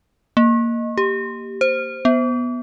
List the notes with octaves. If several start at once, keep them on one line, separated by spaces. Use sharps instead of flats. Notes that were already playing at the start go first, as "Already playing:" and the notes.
A#3
G4
C5
B3